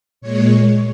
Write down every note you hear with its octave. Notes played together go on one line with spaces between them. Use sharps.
A#2 G#3 C#5